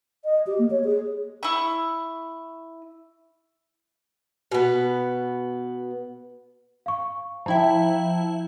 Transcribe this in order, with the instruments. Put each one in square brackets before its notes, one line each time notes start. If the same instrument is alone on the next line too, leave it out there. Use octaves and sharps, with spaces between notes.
[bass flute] D#5
G4
A#3
C#5
G#4
[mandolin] E4 C#6
[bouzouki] B2 B3
[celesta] F5 C#6
[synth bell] F3 E4 E5 [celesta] G5 A#5